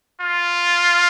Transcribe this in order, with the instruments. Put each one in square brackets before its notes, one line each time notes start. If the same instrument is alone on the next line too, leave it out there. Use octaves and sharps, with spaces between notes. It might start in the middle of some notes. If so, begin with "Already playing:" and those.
[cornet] F4